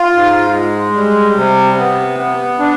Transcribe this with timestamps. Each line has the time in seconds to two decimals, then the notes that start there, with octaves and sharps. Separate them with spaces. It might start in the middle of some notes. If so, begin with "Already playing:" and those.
Already playing: F4
0.13 G#2
0.53 G#3
0.95 G3
1.36 C3
1.78 B3
2.19 B3
2.59 D4